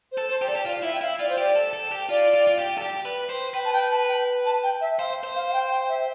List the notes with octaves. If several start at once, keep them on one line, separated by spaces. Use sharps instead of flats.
C5
A4
C5
G4
A4 D5
G4
F4 D5
F5
E4 E5
G5
E4 F5
F4 D5
C5
G4 D5
A4
A4
G4
F4 D5
F4
F4
G4
A4
G4
B4
C5
B4 G5
A5
G5
A5
A5
G5
A5
G5
E5
C5 F5
C5
F5
F5
G5
G5
E5